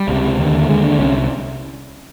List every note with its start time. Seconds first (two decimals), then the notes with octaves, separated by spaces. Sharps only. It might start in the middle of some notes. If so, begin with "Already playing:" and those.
Already playing: G3
0.08 C#2 C3
0.38 D#2 D3
0.69 D#2 D3 G#3
0.85 D4
0.99 C2 C3 C#4